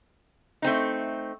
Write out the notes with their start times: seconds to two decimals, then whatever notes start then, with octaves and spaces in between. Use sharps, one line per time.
0.62 A3 C4 D#4